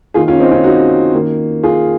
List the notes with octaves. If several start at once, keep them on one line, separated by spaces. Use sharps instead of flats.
D#3 A#3 F4 G#4
C#4 F4
C4 D#4
C#4 F4
D#4 F#4
D#3 A#3
F4 G#4